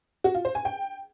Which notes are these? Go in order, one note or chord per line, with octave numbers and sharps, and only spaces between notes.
F#4
F4
C5
G#5
G5